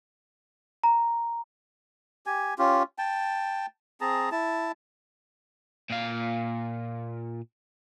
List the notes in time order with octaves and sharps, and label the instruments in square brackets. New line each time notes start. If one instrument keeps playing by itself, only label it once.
[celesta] A#5
[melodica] G4 G#5
C#4 F4 G4
G5 A5
C4 G#4 A5 A#5
E4 A5
[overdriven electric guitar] A#2 F5